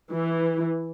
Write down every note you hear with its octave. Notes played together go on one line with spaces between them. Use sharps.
E3